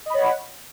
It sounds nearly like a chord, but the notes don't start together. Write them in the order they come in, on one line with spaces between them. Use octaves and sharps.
D#5 B5 C#5 F#5